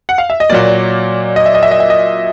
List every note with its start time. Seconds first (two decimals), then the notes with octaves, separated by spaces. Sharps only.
0.09 F#5
0.18 F5
0.30 E5
0.40 D#5
0.50 A#2 F#3 A#3 D5
1.36 D#5
1.46 E5
1.55 D#5
1.63 E5
1.71 D#5
1.80 E5
1.90 D#5